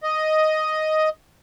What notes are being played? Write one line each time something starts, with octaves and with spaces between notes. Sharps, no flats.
D#5